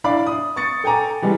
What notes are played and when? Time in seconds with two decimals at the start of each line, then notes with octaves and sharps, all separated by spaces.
0.04 D4 E4 D5 F5 B5 D6
0.27 D#6
0.56 C#6 D#6 A6 C#7
0.84 A4 G5 G#5 A#5 D6
1.22 E3 G3 G#3